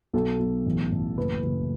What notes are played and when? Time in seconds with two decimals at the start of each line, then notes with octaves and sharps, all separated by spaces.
0.13 B1 A4
0.39 B1
0.66 A1
0.92 A1
1.18 F#1 B4
1.43 F#1